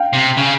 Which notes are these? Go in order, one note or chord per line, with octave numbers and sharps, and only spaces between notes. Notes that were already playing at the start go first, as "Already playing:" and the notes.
Already playing: F5 G5
C3
C#3